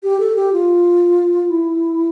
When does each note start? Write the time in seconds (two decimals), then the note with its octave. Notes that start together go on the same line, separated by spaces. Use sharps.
0.03 G4
0.20 A4
0.36 G4
0.53 F4
1.50 E4